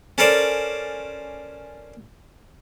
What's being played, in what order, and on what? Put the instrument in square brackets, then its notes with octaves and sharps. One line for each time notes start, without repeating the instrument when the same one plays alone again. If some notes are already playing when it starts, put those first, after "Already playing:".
[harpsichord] C#4 A4 A#4 C5 D5